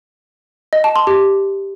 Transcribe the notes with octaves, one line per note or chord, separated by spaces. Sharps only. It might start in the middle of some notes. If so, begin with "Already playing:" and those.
D#5
A5
C6
G4